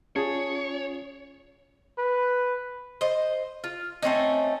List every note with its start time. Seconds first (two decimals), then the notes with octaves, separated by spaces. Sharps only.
0.16 C#4 F4 G#4 C#5 A5
1.98 B4
3.01 C5 D#5
3.64 F4
4.02 A3 C4 C#4 D#4